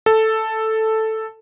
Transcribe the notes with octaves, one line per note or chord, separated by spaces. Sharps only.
A4